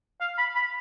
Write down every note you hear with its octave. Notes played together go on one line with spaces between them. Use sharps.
F5
B5
B5